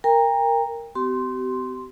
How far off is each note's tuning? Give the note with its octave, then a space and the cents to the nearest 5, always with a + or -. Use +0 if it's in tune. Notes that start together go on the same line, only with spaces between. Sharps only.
A#4 -5 G5 +35 A#5 +0
C4 -45 G4 -40 C6 +0